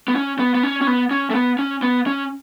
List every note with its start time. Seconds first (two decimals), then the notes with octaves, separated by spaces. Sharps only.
0.08 B3
0.16 C#4
0.39 B3
0.55 B3
0.63 C#4
0.81 C#4
0.87 B3
1.11 C#4
1.30 A3
1.35 B3
1.59 C#4
1.83 B3
2.07 C#4